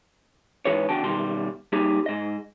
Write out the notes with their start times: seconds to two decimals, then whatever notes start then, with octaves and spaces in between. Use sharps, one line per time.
0.65 G#2 E3 G#4 B4 C#5
0.89 E2 D3 F#4 G5 A5
1.03 B2 D#3 G3 C6
1.72 G3 A#3 D#4 G4 G#4
2.06 G#2 D#5